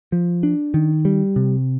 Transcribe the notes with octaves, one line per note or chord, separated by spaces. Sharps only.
F3
D4
D#3
G3
C3